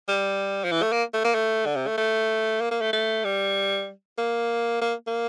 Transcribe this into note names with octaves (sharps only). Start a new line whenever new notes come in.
G3
F3
E3
A3
A#3
A3
A#3
A3
D3
C3
A3
A3
A#3
A#3
A3
A3
G3
A#3
A#3
A#3